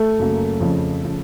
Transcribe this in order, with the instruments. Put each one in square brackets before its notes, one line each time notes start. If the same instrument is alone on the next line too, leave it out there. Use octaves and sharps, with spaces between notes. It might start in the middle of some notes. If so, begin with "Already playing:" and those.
Already playing: [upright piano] A3
[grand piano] F#2 C#3 F#3 A#3
F2 C#3 F3
C#3 F3